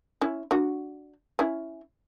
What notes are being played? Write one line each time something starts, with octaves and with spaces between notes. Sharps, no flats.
C#4 E4
D4 F#4
C#4 E4